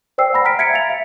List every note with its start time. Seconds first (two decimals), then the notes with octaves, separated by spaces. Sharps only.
0.18 C5 D5 G5 E6 C7
0.33 F#5 G#5 B5 A#6
0.44 A#5 F6 B6 D7
0.59 E5 G#6 B6 C#7 D7
0.73 F5 A6 F7
0.89 E5